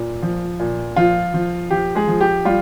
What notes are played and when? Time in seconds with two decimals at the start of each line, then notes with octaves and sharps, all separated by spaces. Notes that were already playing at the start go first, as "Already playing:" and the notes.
Already playing: A#2
0.22 F3
0.60 A#2
0.96 F3 F4
1.34 F3
1.70 F3 G4
1.95 G#3 G#4
2.08 F3
2.21 G4
2.45 G3 F4